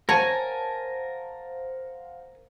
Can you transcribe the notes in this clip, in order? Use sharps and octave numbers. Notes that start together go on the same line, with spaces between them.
A#4 C5 C#5 F5 F#5 G#5 A5